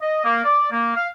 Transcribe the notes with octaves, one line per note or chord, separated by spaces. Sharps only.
D#5
A#3
D5
A#3
F5